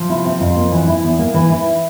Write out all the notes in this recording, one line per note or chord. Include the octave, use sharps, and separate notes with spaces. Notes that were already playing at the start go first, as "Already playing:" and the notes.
Already playing: F3
C3 E4
C4
F2 F4
A#3
E3
E4
E2
A#3
E3
E4